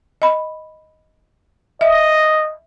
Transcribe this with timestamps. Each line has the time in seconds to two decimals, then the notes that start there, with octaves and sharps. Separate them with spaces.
0.22 D#5 B5
1.81 D#5 E5